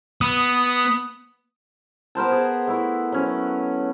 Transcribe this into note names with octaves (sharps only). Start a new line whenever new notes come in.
B3 D#6
B3 A#4 C5 A5
G#4
A3 E4
F#3 C#4